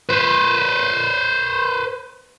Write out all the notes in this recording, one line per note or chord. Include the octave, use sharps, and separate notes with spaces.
B4 C5